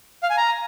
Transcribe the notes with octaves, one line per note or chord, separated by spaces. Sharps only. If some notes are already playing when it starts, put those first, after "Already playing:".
F5
G#5
A#5